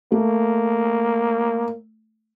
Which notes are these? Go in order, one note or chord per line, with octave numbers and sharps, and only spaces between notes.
A3 A#3